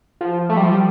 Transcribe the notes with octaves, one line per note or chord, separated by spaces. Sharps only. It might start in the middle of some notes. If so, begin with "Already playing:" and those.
F3
A3
G3
F3
G3